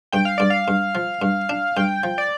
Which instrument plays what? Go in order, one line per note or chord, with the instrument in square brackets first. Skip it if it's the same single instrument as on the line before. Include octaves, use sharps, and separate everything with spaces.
[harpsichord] G2 [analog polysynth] G5
[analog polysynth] F5
[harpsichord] G2 [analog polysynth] D5
[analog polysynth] F5
[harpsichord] G2
F3
G2
D4
[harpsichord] G2 [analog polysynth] G5
[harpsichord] F3
[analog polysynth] D5